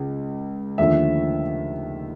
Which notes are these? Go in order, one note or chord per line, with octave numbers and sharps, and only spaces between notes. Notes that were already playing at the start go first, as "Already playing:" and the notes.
Already playing: C#2 C#3
D#2 D3 F3 A3 E5